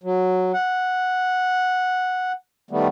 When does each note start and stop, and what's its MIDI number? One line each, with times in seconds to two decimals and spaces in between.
0.03 0.52 54
0.54 2.32 78
2.71 2.88 51
2.71 2.88 55
2.71 2.88 57
2.71 2.88 59